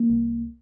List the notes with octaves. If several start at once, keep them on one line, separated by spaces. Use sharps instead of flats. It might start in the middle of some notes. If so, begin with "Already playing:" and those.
Already playing: A#3
C2